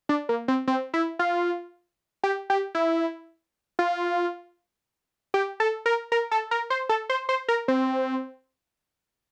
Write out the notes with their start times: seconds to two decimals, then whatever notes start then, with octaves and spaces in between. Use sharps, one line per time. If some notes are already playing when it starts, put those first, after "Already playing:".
0.09 D4
0.29 A#3
0.48 C4
0.67 C4
0.94 E4
1.19 F4
2.23 G4
2.50 G4
2.75 E4
3.79 F4
5.34 G4
5.60 A4
5.86 A#4
6.12 A#4
6.31 A4
6.51 A#4
6.70 C5
6.89 A4
7.10 C5
7.29 C5
7.48 A#4
7.68 C4